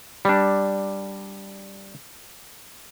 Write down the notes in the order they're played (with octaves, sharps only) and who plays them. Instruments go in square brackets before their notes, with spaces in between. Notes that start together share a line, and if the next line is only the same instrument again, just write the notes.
[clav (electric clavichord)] G3 D4